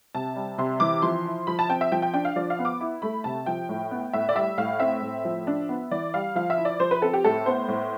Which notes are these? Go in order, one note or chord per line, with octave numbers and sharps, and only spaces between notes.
C3 A5
G3
C3 C6
E3 D6
F3 C6
E4
F3 B5
A5
C4 G5
E5
F3 G5
G5
D4 G5
F5
F3 D5
F5
B3
D6
E4
A3 B5
C3 A5
F3 G5
A2
B3
A2 E5
D5
G3 E5
A2 F5
C4 E5
A2
F3
D4
B3
E3 D5
G3 F5
F3 F5
E5
E4
D5
F3 C5
B4
C4 A4
G4
A2 A4
B3 C5
A2